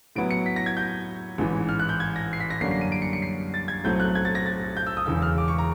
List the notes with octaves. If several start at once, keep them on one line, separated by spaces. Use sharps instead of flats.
A2 F#3 B3 E4 D7
C#7
B6
A#6
G#6
G6
A1 G#2 E3
F6
F#6
G6
G#6
A#6
C7
B6
A#6
F#2 D3 G3 A#3 C#4 C7
C7
D#7
D7
C#7
C#7
C7
A6
G#6
B1 A2 F#3 A3 C4 G6
F#6
G#6
A6
A#6
A6
G6
E6
D#6
E1 E2 C#3 E3 E6
F6
D6
C#6
A#5